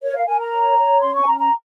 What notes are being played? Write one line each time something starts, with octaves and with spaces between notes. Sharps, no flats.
A#4 C#5
F5
A#4 G#5
A#5
C#5
C#5
C#4 C6
C#6
G#5
C#4 A#5
A#5